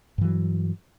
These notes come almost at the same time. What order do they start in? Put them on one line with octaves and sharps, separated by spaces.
G2 E3 F#3